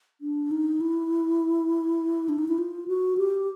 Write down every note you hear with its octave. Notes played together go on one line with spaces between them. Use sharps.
D4
D#4
E4
D4
D#4
E4
F4
F#4
G4